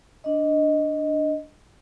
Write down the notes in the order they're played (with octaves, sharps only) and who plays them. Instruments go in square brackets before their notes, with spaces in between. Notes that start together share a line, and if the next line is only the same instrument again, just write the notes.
[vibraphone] D4 D#5